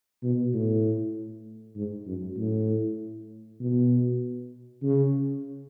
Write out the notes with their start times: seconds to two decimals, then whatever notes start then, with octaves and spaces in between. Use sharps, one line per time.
0.23 B2
0.54 A2
1.76 G#2
2.07 F#2
2.38 A2
3.60 B2
4.83 C#3